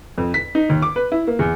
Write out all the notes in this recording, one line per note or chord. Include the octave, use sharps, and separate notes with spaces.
F2
B6
D#4
D#2
D6
B4
E4
A#3
E2